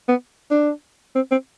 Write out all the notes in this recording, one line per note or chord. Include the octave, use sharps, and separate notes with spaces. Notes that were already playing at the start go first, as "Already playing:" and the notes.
B3
D4
C4
C4